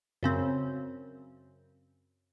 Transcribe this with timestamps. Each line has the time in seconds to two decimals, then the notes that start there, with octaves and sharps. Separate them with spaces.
0.23 F#2 C#3 C4